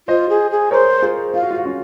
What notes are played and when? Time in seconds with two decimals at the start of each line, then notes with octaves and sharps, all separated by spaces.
0.08 F4 C5 D#5
0.29 G#4
0.51 G#4
0.71 A#4 C5 C#5
1.02 F4 G#4
1.34 F4 F5
1.43 F#4
1.51 F4
1.58 F#4
1.65 C#4 F4